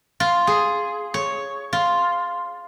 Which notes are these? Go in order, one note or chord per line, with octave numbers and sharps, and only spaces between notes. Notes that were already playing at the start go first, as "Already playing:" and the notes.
F4
G#4
C#5
F4